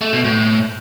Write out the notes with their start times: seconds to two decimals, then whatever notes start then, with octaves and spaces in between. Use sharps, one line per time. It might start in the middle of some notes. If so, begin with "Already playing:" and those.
0.01 A3
0.13 B2
0.25 A2